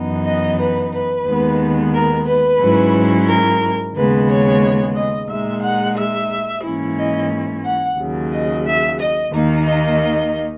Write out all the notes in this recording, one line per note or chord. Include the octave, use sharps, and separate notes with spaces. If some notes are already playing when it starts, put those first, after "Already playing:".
Already playing: F#2 E3 B3 D#4
D#5
B4
B4
D#2 D#3 G#3 B3
A#4
B4
G#2 F#3 C#4 E4
A#4
D#2 C#3 G#3 B3 B4
C#5
D#5
A#2 G#3 D#4 E5
F#5
E5
G#2 E3 A#3 C#4 E4
D#5
F#5
D#2 C#3 F#3
D#5
E5
D#5
D#2 D#3 A#3 D#4
D#5